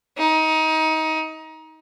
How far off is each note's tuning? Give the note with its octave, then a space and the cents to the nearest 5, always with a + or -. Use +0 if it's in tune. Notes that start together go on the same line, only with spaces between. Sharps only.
D#4 +25